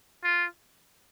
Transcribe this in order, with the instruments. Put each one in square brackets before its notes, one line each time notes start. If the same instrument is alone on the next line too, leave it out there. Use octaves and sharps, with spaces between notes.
[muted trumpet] F4